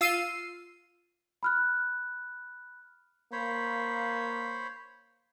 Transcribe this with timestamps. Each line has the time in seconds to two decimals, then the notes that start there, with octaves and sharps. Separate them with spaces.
0.01 F4 E6 C7 D#7
1.43 B5 F6 F#6
3.32 A#3 C5 C#5 B5